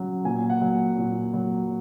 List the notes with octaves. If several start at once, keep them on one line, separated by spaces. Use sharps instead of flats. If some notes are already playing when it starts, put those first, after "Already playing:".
Already playing: C#3 F#3
A#2 G#5
F#5
F#3
A#2
F#3